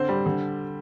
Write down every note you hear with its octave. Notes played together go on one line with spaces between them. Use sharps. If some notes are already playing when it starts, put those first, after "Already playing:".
Already playing: D3 C4 C5
G3
D3